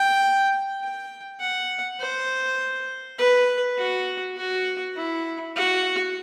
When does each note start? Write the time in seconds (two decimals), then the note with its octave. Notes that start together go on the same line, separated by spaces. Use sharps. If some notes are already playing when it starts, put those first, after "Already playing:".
Already playing: G5
0.81 G5
1.40 F#5
2.00 C5
3.18 B4
3.78 F#4
4.37 F#4
4.97 E4
5.56 F#4